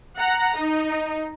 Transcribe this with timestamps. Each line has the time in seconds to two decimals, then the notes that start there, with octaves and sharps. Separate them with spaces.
0.16 F#5 A#5
0.56 D#4